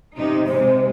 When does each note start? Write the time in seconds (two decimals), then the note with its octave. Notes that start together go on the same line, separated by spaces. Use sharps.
0.15 C3 D#4
0.47 C3 G#3 C5